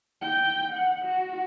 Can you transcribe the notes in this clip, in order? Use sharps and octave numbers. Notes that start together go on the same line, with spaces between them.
G5
F#5
F#4